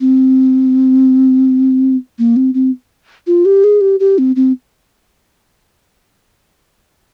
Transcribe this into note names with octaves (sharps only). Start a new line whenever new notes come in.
C4
A#3
C4
C4
F4
G4
G#4
G4
G4
C4
C4